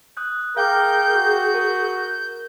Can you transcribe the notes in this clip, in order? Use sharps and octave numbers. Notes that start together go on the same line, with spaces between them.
D#6 F#6 G6
G#4 A#4 F5 G5 D6 G6
F#4
A#4